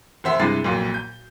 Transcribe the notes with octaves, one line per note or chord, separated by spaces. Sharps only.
F1 C5 E5
G2 C3 G#3 E4 A6 C7
B1 F2 A#2
G6